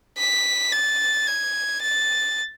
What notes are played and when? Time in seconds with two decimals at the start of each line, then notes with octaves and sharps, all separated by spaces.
0.18 B6
0.72 A6
1.27 G#6
1.82 A6